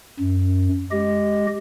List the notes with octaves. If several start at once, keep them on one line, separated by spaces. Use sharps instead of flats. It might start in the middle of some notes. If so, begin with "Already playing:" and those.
F#2
G#3 G4 D#5